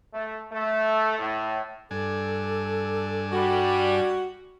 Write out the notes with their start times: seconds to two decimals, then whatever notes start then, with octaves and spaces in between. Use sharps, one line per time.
0.14 A3
0.52 A3
1.19 A2
1.91 G2 D4 A4 G#5
3.31 G3 F#4